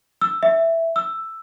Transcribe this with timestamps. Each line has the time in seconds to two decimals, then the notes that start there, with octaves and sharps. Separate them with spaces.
0.21 E6
0.43 E5
0.96 E6